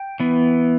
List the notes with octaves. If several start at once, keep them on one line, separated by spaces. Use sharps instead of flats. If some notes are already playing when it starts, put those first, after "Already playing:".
Already playing: G5
E3 B3